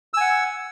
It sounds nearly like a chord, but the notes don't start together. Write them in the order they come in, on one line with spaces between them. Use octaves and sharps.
E6 G#5 F#5